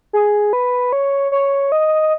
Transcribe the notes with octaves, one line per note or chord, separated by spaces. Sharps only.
G#4
B4
C#5
C#5
D#5